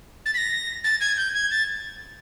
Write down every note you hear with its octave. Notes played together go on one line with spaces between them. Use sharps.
A6
B6
A#6
A6
G#6
G6
G#6
A6